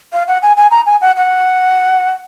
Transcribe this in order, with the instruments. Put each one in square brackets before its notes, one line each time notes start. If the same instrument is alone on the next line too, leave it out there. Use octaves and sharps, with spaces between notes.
[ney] F5
F#5
G#5
G#5
A#5
G#5
F#5
F#5